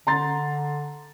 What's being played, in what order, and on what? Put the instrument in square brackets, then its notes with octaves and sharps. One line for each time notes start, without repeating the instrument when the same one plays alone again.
[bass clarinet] D3 [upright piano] A#5 C6 A6